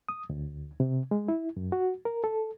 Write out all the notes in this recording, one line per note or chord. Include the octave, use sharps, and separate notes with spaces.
D#6
D2
C3
G#3
E4
F#2
F#4
A#4
A4